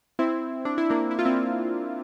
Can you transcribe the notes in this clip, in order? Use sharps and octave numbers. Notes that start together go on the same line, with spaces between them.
C4 E4
D4
E4
A#3 D4
E4
F4
C4 E4